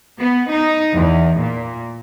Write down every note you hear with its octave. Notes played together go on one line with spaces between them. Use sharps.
B3
D#4
E2
A#2